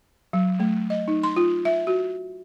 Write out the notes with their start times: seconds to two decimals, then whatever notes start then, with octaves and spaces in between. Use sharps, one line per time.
0.33 F#3
0.60 A3
0.90 D#5
1.08 D#4
1.23 C6
1.36 F4
1.65 E5
1.87 F#4